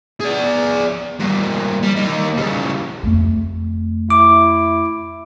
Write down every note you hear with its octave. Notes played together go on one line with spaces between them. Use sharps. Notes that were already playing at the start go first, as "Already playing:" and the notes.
G#4 D5
G2 A#3
G3
A#3 D#4
C#3 G3
F2 A3
E4 D6